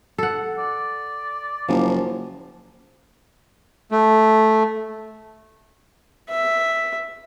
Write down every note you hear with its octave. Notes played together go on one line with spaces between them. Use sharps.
A4 F#5
D5
F#1 F3
A3
E5